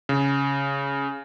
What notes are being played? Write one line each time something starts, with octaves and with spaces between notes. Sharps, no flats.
C#3